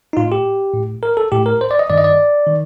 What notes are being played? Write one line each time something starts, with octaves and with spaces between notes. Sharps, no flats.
D#4
A2 F4
G4
A2
A#4
A4
A2 G4
A#4
C5
D5
D#5
G2 D#3 D5
D#5
D5
D#3